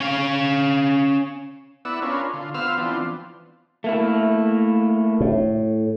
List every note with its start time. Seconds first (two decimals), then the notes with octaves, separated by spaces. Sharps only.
0.01 C#4 F5
1.85 B3 E4 D5 F#5 E6
2.02 C#4 D4 F4 A#4 B4 C#5
2.33 D3 F4
2.54 B3 F4 C5 F5 E6 F6
2.78 E3 F3 B3 C4 D4 F4
3.84 A3 A#3 E4
5.20 A2